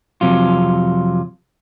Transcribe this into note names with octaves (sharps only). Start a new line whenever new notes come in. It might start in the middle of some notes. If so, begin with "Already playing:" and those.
F2 C3 F#3 F4